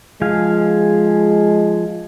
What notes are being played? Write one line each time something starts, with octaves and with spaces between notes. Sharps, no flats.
F3 G#3 G#4 F5